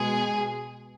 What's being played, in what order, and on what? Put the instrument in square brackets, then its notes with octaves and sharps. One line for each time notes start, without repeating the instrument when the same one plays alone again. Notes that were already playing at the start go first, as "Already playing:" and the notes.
Already playing: [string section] B2 G#3 G#4